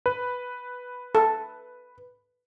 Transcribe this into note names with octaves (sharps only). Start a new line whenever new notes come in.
B4
A4